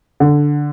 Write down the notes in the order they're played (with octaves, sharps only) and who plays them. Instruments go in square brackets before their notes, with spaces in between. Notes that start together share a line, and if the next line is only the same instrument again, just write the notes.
[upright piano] D3